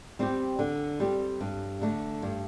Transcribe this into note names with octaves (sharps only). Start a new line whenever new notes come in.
G3 C4 G4
D3
G3 C4 G4
G2
D3 A3
G2